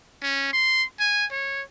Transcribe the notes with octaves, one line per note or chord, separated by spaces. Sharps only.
C#4
C6
G#5
C#5